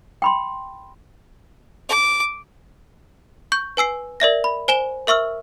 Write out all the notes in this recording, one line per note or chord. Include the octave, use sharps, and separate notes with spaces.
G5 B5 C6
D6
C#6 G6
B4 G#5 E6 C7
A#4 D5 E5 A#6
B5
C5 G#5 E7 G7
A#4 E5 C#6 E6 F6